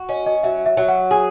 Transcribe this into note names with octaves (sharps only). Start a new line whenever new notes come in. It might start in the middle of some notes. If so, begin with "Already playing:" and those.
Already playing: F#4
C#4 D#5
D#5
F#3 E5
E5
F#3
F#5
G#4 G#5